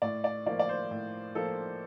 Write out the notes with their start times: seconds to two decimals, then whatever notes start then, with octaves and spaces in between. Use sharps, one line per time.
0.02 A2 D5
0.24 D5
0.46 F3 A#3 D5
0.59 D5
0.69 C5
0.91 A2
1.35 F3 A#3 A4